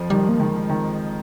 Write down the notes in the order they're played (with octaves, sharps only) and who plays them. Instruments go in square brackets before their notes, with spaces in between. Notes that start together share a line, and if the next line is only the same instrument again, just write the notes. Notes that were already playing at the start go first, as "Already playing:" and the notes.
Already playing: [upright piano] F2 F3
[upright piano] D#3 [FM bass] G3
[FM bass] A#3
[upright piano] D#3 [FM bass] G#3
[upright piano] D#3